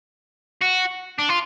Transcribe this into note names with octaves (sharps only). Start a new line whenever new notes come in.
F#4
D4
F4